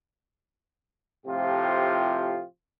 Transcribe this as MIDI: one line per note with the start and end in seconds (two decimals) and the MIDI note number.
1.26 2.43 45
1.26 2.43 48
1.26 2.43 53
1.26 2.43 57
1.26 2.43 65
1.26 2.43 67